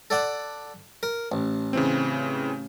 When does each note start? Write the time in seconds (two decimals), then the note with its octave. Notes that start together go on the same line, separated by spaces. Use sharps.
0.10 A4 D5 F#5
1.03 A#4
1.32 A1
1.73 C#3 E3 C4